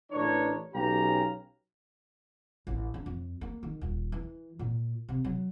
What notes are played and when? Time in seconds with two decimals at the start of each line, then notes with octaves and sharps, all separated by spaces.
0.11 A1 E3 D4 A#4 C#5
0.74 B1 C#4 G4 F5 G5 A#5
2.67 A1
2.94 D4
3.06 F2
3.41 A#3
3.63 D#3
3.81 D#1
4.12 E3
4.59 A#2
5.09 C3
5.24 F#3